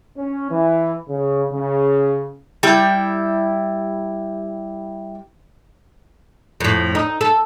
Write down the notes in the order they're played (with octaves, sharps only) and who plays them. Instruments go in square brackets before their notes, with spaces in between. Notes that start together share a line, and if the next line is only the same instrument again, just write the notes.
[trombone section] C#4
E3
C#3
C#3
[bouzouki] G3 E4 G5
[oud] F2 A2
D#4
A4